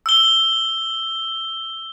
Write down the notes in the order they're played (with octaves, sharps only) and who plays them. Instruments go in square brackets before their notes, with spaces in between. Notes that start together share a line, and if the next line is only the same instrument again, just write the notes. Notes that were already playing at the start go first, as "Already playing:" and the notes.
[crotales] E6 G7